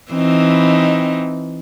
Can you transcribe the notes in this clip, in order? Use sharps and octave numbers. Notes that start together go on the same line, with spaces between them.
E3 C4 D#4